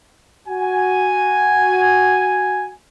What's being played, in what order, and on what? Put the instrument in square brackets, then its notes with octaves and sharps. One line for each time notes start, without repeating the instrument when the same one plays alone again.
[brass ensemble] F#4 G#5